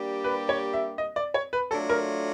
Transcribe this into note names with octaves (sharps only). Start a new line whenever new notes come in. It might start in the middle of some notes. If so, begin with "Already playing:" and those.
Already playing: G3 A#3 D4 G4
B4
C#5
E5
D#5
D5
C#5
B4
F#3 A3 D4 F4 A4
A#4